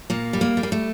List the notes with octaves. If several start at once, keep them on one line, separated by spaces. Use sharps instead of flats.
A#2 A#3
G3
A#3
G3
A#3
A3